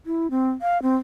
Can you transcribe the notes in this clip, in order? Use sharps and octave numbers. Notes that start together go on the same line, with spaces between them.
E4
C4
F5
C4